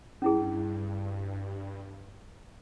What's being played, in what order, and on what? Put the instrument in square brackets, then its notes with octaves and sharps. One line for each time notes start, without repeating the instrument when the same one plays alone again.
[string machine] G2 [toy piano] C#4 E4 G#4